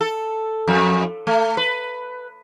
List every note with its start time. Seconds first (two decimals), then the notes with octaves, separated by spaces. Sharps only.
0.01 A4
0.67 F2
1.27 A3
1.57 B4